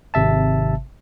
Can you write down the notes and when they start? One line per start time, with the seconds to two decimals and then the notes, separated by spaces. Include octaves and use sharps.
0.14 G#1 C3 E5 A5